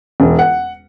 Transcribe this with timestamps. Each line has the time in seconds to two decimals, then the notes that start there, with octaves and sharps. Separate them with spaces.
0.20 E1
0.39 F#5